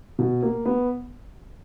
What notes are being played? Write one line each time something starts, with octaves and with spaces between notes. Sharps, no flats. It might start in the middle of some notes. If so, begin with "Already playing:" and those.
B2
A#3
B3